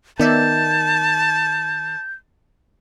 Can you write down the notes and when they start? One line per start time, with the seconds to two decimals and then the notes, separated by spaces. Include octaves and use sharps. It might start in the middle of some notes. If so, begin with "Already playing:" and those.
0.19 D#3 B3 D5 E5 A5 G6